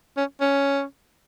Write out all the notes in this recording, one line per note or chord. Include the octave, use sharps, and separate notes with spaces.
C#4
C#4